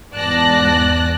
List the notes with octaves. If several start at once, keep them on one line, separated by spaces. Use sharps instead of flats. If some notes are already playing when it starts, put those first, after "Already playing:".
E2 G#2 D5 A5 F#6 A#6